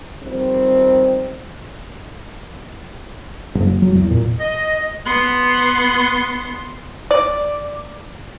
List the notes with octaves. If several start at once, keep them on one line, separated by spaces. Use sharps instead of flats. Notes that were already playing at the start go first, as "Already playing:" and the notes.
D#3 F3 G3 C4
F#1
F#3
E2
A#2
D#5
B3 C6
D5